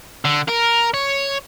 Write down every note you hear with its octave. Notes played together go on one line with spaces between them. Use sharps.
D3
A#4
C#5